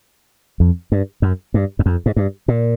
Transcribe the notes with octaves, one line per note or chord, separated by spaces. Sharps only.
F2
G2
F#2
G2
F#2
F2
G#2
G2
A#2